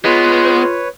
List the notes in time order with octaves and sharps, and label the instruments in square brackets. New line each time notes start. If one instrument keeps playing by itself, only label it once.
[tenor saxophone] G#3 [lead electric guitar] B3 [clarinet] F4 [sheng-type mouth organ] B4 C#5